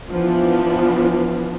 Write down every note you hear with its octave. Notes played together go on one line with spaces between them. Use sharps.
E3 F3 B3 D4 F4